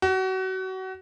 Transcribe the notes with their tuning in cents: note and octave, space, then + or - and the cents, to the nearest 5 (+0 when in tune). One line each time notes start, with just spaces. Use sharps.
F#4 +30